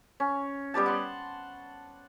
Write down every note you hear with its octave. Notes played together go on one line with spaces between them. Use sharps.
C#4
G3 B3 G4 A5
F#5 C6